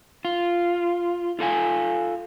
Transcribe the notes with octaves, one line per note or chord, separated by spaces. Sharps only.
F4
F4 A4 F5 G#5